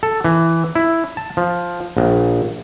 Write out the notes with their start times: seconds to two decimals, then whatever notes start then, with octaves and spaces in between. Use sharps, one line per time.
0.03 A4
0.25 E3
0.75 E4
1.17 A5
1.37 F3
1.97 A#1